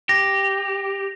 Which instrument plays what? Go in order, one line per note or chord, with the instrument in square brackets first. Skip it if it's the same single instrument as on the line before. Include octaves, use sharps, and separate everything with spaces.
[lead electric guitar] G4 [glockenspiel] A#6